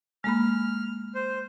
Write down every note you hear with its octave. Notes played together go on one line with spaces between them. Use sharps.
G#3 A#3 B5 F6
C5